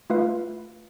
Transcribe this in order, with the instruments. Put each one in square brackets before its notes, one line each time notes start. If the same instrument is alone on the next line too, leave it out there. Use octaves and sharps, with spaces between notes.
[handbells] A3 F4 B4 F5